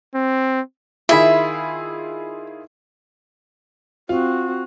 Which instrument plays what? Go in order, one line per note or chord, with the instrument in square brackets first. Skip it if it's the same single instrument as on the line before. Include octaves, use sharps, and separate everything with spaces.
[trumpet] C4
[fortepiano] D#3 E4 [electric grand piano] F4 G#4 B5 [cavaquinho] E5
[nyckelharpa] C4 [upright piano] F4 [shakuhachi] F#4